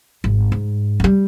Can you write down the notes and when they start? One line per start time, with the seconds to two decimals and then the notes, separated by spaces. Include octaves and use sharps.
0.24 G#1
0.52 G#2
1.00 G3 G#3